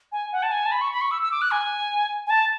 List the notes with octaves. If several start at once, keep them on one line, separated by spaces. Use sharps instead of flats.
G#5
F#5
A5
G#5
A5
B5
C#6
B5
C#6
E6
E6
D6
F#6
G#5
G#5
A5